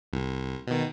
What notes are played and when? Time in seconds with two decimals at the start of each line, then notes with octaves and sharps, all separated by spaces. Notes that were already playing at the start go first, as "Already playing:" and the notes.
0.13 C2
0.67 B2 D#3